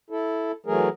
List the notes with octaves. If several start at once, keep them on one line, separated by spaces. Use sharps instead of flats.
E4 A4
E3 F#3 A3 G#4 A#4